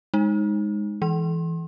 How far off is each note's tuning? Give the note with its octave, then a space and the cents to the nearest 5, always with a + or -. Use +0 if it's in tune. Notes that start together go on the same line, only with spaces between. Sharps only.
G#3 -10 D#4 +0
E3 +0 C6 +35